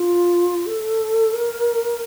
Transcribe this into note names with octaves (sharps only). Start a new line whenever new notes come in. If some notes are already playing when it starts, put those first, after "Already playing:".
Already playing: F4
A4
A#4